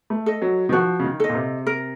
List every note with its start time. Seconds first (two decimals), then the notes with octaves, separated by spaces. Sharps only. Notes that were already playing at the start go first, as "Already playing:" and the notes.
0.10 A3
0.26 A4 D#5
0.42 F#3
0.69 D#3
0.72 F3 F#4
0.99 C#3
1.04 D#3
1.20 A4 D#5
1.29 A#2
1.35 C3
1.67 A#4